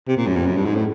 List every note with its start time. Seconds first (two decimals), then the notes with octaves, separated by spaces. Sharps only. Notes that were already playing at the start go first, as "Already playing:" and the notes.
0.08 C3
0.17 A#2
0.27 F#2
0.36 F2
0.46 F#2
0.56 G2
0.65 G#2
0.75 A2